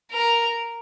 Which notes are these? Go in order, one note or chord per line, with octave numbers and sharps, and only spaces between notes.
A#4